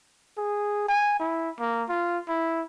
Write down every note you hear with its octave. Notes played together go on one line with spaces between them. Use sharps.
G#4
G#5
E4
A#3
F4
E4